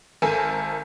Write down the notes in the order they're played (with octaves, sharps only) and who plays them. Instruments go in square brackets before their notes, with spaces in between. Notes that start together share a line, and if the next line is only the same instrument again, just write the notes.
[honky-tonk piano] G#1 A4 A#4 G#5 A5